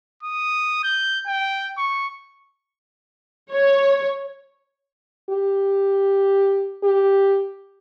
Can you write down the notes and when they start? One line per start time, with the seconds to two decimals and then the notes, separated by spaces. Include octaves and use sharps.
0.23 D#6
0.84 G6
1.27 G5
1.77 C#6
3.51 C#5
5.30 G4
6.83 G4